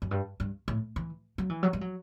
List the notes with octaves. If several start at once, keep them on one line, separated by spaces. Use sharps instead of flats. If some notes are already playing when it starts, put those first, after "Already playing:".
F#2
G2
G2
A2
E3
F#3
E3
F#3
G3
F#3